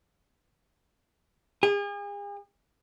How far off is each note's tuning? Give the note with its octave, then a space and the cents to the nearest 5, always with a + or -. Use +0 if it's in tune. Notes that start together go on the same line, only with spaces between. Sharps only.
G#4 -40